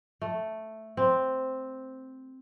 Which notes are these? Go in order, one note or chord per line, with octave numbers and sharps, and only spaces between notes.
A3
C4